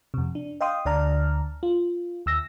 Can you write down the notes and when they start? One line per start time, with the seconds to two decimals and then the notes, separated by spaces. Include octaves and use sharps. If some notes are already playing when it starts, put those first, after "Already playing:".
0.14 F2 C3
0.35 D4
0.61 D#5 F5 G5 C6 D#6
0.85 D2 D3 D5 A5 A#5 F6
1.63 F4
2.26 D#2 E6 A#6